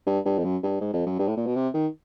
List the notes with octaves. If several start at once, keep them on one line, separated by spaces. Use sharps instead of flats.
G2
G2
F2
F#2
G2
G#2
F2
F#2
G2
A2
A#2
B2
C3
D#3